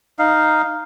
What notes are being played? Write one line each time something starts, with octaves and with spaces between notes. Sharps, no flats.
D#4 F5